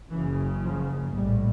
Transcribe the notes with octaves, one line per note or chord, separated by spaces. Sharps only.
F#1 F#2 C#3 E3
F3
A#1 A2 G3